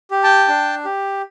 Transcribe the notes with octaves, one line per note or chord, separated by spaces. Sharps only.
G4
G5 A5
D4
G4